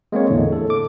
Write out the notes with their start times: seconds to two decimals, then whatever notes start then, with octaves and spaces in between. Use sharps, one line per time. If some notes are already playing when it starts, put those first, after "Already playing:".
0.12 G#3 A#3 C4 C#5
0.29 E2 A2 D3
0.52 A4
0.70 D6